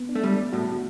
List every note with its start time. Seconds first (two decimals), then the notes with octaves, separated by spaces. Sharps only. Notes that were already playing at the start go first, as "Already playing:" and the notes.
Already playing: B3
0.09 D4
0.15 A3
0.24 G3
0.53 A2 F#4